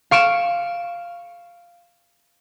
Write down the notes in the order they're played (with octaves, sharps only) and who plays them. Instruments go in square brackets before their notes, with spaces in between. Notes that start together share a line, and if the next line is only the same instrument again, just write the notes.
[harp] F5 C#6 D7 E7